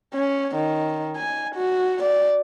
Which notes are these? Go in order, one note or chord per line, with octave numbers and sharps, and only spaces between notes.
C#4
D#3
G#5
F#4
D5